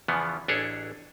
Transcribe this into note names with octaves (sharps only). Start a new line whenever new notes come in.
E2 C#3 E3 F3 B3
A1 D4 E4 G#4 A4 C#5